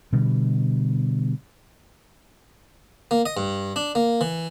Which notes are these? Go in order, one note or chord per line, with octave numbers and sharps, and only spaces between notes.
B2 D3 G3
A#3
D#5
G2
D4
A#3
E3